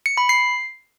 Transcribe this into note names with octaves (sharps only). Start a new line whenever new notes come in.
C#7
B5
C7